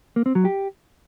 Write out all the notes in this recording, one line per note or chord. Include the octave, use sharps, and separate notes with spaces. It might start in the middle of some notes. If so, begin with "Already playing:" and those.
A#3
C4
F#3
G4